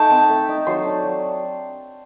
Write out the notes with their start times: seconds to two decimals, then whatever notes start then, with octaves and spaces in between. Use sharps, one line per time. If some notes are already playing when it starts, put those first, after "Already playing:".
Already playing: A3 D#4 G5 A5
0.11 C4
0.30 A3
0.49 D#4
0.67 F#3 C6
0.85 D4
1.04 F#3